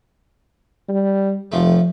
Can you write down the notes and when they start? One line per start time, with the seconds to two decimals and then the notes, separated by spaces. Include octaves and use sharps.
0.89 G3
1.52 F1 F3 A3